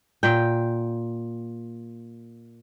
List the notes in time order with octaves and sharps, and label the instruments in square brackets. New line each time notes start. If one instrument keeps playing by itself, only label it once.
[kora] A#2 G5